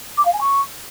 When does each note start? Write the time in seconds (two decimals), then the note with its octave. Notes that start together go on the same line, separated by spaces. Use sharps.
0.17 D6
0.25 F5
0.33 G#5
0.40 C#6